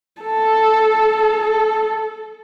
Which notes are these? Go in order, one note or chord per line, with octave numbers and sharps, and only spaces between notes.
A4
A4